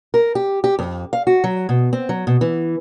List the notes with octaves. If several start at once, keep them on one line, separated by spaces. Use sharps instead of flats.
A#4
G4
G4
F2
F5
F#4
F#3
B2
C4
F#3
B2
E3